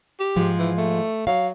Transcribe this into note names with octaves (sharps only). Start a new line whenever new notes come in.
G4
G#2 F3 G#3
E3
A3
F#3 F5